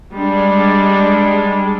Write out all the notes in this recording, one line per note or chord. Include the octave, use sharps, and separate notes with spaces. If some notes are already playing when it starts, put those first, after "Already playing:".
G3 G#3 D4